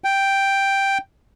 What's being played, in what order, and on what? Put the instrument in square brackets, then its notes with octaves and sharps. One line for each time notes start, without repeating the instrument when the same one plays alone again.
[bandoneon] G5